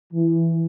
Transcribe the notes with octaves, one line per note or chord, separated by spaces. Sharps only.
E3